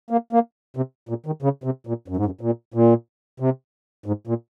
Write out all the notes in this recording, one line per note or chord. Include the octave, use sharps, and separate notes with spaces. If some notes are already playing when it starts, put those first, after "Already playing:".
A#3
A#3
C3
A#2
D#3
C#3
C3
A#2
F#2
G#2
F#2
A#2
A#2
C3
G#2
A#2